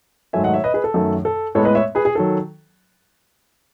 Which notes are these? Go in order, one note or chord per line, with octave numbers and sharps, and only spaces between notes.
G#2 D#3 F#3 A3 E5 G#5
D#5 F#5
C#5 E5
B4 D#5
G#4 B4
A4
F#2 D#3 A3
A4
A2 G#3 B3 A4 C#5
B4 D#5
C#5 E5
G#4 B4
G#4
D#3 F#3 A4